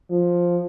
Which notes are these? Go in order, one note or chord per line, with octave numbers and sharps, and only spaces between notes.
F3